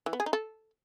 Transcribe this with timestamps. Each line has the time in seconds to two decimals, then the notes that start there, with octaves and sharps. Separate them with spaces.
0.06 E3
0.13 B3
0.20 G#4
0.26 D#4
0.33 A4